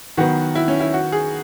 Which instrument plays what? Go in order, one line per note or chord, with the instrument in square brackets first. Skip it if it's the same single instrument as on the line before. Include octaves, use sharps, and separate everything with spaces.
[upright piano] D#3 F#3 B3 [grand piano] F#4
[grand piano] E4
C#4
E4
F#4
G#4